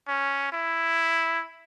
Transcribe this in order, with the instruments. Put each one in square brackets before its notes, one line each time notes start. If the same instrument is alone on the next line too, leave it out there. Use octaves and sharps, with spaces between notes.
[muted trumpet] C#4
E4